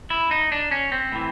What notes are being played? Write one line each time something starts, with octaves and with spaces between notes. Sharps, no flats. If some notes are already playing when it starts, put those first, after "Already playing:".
E4
D#4
D4
C#4
C4
A2 E3